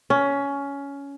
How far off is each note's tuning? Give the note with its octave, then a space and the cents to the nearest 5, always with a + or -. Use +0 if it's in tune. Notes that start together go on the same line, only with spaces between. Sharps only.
C#4 +15